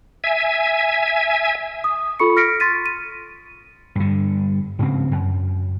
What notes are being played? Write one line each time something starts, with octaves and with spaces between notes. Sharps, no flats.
E5 G#5
D#6
F4 A4 B5 C#6 C#7
F6 A#6 B6 C#7 D7
C6 A6 B6 D#7
D#7
G2 D3
G#2 C#3 C4
F#2